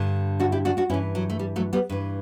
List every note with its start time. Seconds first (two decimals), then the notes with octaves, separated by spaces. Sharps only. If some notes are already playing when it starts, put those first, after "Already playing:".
Already playing: G2 D3
0.40 D4 F#4
0.52 E4 G4
0.65 D4 F#4
0.77 D4 F#4
0.90 G2 C#4 E4
0.94 E3
1.15 F#3
1.30 A3
1.39 G3
1.56 F#3 A3
1.73 G3 B3
1.89 G2 E3